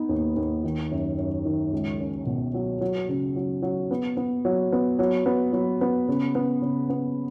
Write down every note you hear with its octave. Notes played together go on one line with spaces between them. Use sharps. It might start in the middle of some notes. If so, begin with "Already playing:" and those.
Already playing: B3 D#4
D#2
D#2
D#3
F#2
F#2
D#3
C#2
C#4
B2
F#3
F#3
C#3
F#3
F#3
B3
B3
F#3
B3
F#3
B3
F#3
B3
C#3
B3
C#3
B3